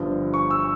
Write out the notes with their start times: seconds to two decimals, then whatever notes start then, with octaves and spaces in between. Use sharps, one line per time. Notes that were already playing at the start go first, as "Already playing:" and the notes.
Already playing: G1 G2 F3
0.34 C#6
0.51 E6